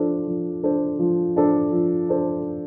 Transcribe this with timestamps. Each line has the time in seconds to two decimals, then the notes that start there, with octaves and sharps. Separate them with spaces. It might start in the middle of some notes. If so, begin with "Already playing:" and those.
Already playing: F3 D4 A4 C5
0.27 F3
0.63 D4 A4 C5
0.99 F3
1.36 D4 A4 C5
1.73 F3
2.09 D4 A4 C5